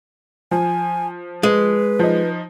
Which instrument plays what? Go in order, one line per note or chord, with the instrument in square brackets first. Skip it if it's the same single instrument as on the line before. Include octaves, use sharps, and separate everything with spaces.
[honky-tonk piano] F3 [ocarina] G#5
[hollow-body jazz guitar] G#3 [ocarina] B4
[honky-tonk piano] F3 D#4